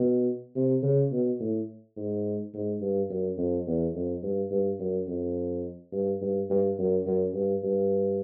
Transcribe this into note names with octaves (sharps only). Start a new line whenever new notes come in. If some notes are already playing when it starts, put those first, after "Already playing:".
Already playing: B2
C3
C#3
B2
A2
G#2
G#2
G2
F#2
F2
E2
F2
G2
G2
F#2
F2
G2
G2
G2
F#2
F#2
G2
G2